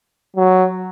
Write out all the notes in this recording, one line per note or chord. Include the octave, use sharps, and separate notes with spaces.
F#3